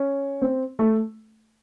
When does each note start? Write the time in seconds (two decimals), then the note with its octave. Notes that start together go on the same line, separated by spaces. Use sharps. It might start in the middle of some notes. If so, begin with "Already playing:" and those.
Already playing: C#4
0.42 C4
0.79 A3